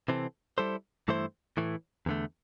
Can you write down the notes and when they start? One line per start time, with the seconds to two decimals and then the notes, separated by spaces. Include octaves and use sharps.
0.08 C3 E3 C4 A4
0.58 G3 E4 A4 C5
1.08 G2 E3 A3 E4 C5
1.57 A2 E3 A3
2.06 E2 D3 A3